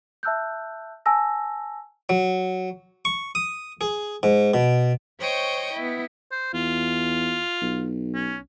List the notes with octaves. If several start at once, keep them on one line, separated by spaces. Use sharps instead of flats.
E5 A5 E6 F#6 G6
G#5 A5 E6 A#6
F#3
C#6
D#6
G#4
G#2
B2
C5 C#5 D#5 G5 C#6
B3 E4
C5
E2 F4
B1
C#4